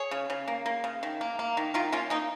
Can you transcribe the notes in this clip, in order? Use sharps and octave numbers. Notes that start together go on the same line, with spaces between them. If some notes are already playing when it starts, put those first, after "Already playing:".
Already playing: G#4 C#5
C#3
C#3
A#3
A#3
C#3
D#3
A#3
A#3
D#3
D#3 F4 A#4
A#3 C#4 F4
A#3 D#4